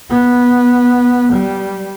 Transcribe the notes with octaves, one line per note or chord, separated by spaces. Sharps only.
B3
G3